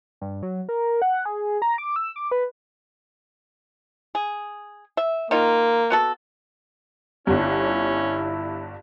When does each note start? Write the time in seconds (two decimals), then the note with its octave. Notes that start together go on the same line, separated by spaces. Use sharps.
0.21 G2
0.43 F#3
0.69 A#4
1.02 F#5
1.25 G#4
1.62 A#5
1.78 D6
1.96 E6
2.16 D6
2.31 B4
4.15 G#4
4.97 E5
5.31 D#3 A#3 D#4 F4
5.90 B3 F#4 A4
7.27 G1 G2 C#4 E4